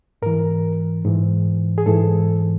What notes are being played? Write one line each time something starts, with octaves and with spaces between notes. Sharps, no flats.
G#2 E3 A#4
G#2 E3
G#4
G#2 E3 A4